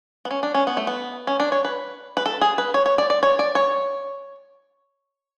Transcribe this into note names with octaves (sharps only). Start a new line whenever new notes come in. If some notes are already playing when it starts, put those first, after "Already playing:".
B3
C#4
D4
C#4
B3
A3
B3
C#4
D4
C#5
B4
B4
A4
G#4
B4
C#5
C#5
D5
D5
C#5
D5
C#5